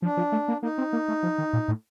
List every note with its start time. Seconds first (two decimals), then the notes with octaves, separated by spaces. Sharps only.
0.02 F3 D4
0.17 F3
0.32 A3
0.48 A#3
0.62 A#3 D#4
0.78 C4
0.93 A#3
1.08 A3
1.23 F3
1.38 D#3
1.53 A#2
1.68 A2